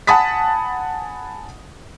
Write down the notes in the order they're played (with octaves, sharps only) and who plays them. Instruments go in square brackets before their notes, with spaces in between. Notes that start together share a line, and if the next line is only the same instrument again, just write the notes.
[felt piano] F#5 G#5 A5 B5 D#6 B6